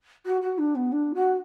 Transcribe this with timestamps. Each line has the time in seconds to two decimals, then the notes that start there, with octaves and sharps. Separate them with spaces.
0.25 F#4
0.42 F#4
0.58 D4
0.75 B3
0.92 D4
1.14 F#4